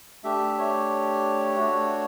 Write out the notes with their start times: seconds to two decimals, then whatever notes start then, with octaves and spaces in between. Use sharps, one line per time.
0.24 A3 D4 G4 E5
0.58 C#5
1.58 A3 D4 F#4